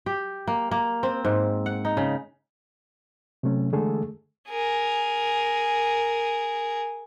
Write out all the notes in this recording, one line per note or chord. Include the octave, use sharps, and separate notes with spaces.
G4
A#3
A#3
C4
G#2
F#5
D#4
C#3
C3 F#3 A3 C#4
D3 E3 G#3 A3 G#4 A4
G#4 A#4